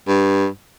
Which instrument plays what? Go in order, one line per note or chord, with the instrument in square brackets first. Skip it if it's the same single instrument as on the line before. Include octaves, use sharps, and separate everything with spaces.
[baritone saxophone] G2